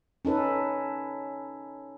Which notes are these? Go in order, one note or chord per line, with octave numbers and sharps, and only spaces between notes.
C#4 D#4 A4 B4